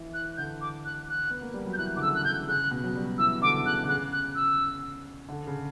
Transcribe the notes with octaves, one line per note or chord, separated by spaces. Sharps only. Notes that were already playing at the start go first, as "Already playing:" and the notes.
Already playing: E3
F#6
D3 G6
D6
F#6
F#6
B3
A#3
G3
F#3
G6
E3 F#6
D3 D6
C#3 E6
F#6
D3 G6
C#3 F#6
B2
F#3
G3
E3 E6
E3
D3 D6
D3
C#3 F#6
D3
C#3 F#6
F#6
E6
D3
C#3